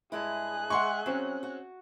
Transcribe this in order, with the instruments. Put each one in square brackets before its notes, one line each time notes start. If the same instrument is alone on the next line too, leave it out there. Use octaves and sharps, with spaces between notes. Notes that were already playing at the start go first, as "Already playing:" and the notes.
[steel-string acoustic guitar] G2 G#3 E4 [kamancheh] G#4 F#6
[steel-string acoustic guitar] G#3 E5 [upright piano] F#5 C6 C#6
[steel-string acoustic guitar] F#3 [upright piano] C4 C#4
[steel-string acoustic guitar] F#4